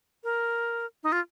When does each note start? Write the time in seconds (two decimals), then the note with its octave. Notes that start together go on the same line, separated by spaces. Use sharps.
0.24 A#4
1.04 D#4
1.12 F4